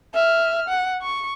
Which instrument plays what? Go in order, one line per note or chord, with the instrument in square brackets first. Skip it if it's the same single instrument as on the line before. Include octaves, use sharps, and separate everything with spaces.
[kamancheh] E5 F6
F#5
C#6